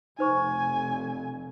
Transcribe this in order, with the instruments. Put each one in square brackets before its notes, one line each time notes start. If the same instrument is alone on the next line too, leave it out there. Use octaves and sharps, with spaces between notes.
[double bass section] F1 F2 [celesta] D#4 C5 C#6 [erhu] G#5